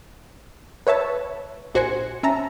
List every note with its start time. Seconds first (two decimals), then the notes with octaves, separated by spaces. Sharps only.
0.87 B4 C#5 E5 A5
1.74 A#1 F#4 C5 G#5 C#7
2.23 C#4 E5 A5 A#5